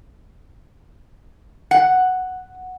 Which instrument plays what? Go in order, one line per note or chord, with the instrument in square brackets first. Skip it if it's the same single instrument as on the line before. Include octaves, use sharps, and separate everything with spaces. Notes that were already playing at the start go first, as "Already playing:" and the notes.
[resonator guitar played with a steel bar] F#5